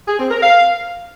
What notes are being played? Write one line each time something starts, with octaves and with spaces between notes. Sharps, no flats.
G#4
C4
A#4
F5